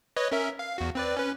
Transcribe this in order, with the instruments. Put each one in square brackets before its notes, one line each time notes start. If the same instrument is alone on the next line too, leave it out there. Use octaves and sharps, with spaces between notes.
[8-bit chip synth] B4 C#5 D#5
C#4 A#4 E5
F5
E2 F#4
C4 B4 D5
C#4 B4